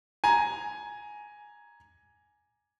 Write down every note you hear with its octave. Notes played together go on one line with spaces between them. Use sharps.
G#5 A#5